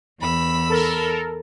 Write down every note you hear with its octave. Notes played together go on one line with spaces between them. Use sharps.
E2 B5 E6
A4 A#4